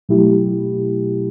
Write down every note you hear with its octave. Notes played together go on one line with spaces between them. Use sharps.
B2 F#3 A3 E4 G4